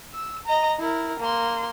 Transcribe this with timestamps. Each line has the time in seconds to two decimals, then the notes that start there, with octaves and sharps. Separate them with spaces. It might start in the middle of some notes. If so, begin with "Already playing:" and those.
0.14 E6
0.46 D#5 A#5
0.79 E4 A#4
1.20 A#3 C6